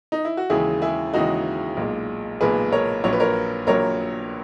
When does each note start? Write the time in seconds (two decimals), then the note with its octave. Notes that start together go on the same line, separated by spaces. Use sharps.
0.12 D#4
0.25 E4
0.37 F#4
0.50 D#2 C#3 E3 G#3 E4 G#4
0.82 E4 G#4
1.13 D#2 C#3 E3 G#3 D#4 F#4
1.77 B1 A#2 G#3
2.41 B1 A#2 G#3 G#4 B4
2.72 A#4 C#5
3.04 A#1 A#2 F#3 C#5
3.13 B4
3.20 A#4 C#5
3.67 A#1 A#2 F#3 A#4 C#5